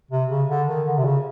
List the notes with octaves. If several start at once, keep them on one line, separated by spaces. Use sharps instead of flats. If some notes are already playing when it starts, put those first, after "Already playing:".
C3
C#3
D3
D#3
D3
C3
C#3